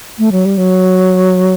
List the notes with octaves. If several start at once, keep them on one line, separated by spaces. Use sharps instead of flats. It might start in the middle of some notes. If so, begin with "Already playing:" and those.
A3
F#3
G3
F#3